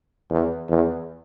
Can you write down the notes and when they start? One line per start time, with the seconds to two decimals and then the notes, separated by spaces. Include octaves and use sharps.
0.30 E2
0.69 E2